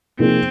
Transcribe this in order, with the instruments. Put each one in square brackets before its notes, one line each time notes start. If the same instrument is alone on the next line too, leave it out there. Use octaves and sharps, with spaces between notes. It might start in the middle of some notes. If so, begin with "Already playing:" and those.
[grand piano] C3 F3 A#3 D#4 G#4 [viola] C4